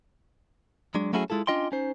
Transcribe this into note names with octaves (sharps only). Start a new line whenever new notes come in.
F#3 G#3 D4
F#3 A3 C#4 E4 F#4 G#4
G#3 E4 F4 A4
C#4 D4 F4 D#5 G5 C6
C#4 D#4 C5